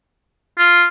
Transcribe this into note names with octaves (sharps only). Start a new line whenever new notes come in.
F4